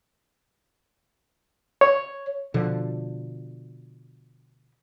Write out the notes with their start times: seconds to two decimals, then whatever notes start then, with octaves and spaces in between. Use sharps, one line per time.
1.81 C#5
2.54 B2 D3 F3